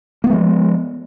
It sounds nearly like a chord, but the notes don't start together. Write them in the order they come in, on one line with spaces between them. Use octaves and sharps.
A#3 B3 G#3 F3